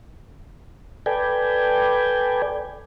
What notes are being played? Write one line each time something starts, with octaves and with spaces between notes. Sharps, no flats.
A4 B4 D5 G5 G#5